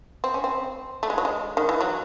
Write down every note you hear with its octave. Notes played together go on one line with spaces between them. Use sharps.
C4
C#4
C4
A3
G#3
F#3
G#3
D#3
E3
F#3